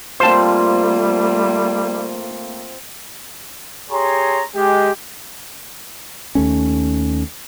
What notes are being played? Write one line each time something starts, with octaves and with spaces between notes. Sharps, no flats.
G3 A3 A#3 C4 F4 C5 A5
G4 G#4 C#5 A#5 C6
G#3 G4
D#2 A3 C#4